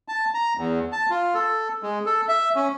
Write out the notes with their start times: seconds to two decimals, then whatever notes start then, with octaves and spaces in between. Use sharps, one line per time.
0.08 A5
0.34 A#5
0.57 E2
0.92 A5
1.10 F4
1.35 A4
1.83 G#3
2.06 A4
2.29 E5
2.55 C#4